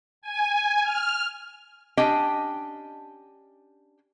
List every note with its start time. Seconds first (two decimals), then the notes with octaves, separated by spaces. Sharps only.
0.22 G#5
0.83 F6
1.97 C#4 D4 G4 D#5 G5